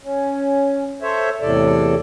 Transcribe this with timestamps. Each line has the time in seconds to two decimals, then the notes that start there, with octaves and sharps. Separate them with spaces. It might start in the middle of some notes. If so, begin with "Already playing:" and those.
0.03 C#4
1.02 A4 C5 C#5 E5
1.41 E2 A2 C3 A4 D5